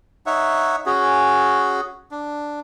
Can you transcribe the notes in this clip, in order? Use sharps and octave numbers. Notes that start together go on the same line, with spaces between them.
D#4 C#5 E5 F#5
C#4 F#4 G#4
D4